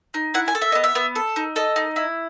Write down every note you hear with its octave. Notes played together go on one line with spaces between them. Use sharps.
D#4
E4 F#5
G#5
A4
E5
B3 D#5
E5
B3
A4
D#4
A4 D#5
D#4
E4